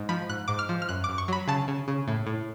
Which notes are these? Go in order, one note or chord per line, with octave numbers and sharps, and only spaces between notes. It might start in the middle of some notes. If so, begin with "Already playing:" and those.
Already playing: G#2
F3 B5
G#2 F#6
G#2 D6
F6
F3
F6
F#2 F#6
F#2 D6
C#6
F#3 B5
C#3 A5
C#3
C#3
A2
A2